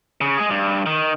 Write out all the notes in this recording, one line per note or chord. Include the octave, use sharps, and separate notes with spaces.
C#3
G#3 G#4
G2
D#3